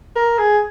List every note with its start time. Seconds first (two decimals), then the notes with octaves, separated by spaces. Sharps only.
0.16 A#4
0.38 G#4